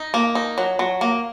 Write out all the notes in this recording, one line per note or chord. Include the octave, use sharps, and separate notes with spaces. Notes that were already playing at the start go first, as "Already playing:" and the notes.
Already playing: D#4
A#3
D#4
F#3
F#3
A#3